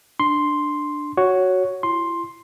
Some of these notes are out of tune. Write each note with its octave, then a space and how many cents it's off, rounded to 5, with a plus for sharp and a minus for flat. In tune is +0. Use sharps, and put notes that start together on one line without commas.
D4 +10 C6 +0
F#4 +0 C#5 +0
E4 +40 C6 +5